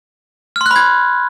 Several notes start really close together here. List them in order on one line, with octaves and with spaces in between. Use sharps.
F6 C6 F#6 B5 G#6